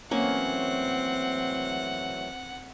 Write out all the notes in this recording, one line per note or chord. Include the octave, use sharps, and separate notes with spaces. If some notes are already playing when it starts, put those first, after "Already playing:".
E3 F#3 A3 A#3 C4 C#4 F#5